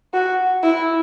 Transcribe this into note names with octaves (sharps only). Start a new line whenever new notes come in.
F#4
E4